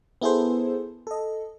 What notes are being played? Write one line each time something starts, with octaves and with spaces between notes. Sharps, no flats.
B3 E4 G#4 A4 C5
A4 D#5